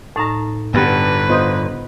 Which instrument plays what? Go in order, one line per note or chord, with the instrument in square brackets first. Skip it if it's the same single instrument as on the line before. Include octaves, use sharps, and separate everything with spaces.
[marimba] A2 D#4 [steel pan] A5 A#5
[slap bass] G2 D3 [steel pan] G3 B3 G4 [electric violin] B4
[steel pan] B3 F4 C5 [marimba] D#5 D#6 G6